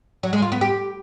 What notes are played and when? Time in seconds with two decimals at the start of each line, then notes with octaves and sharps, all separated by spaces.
0.23 F#3
0.33 G#3
0.42 F4
0.52 B3
0.61 G4